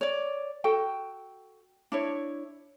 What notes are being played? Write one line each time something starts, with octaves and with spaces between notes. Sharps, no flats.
C#5 D5
F#4 A4 G5
D4 E4 C#5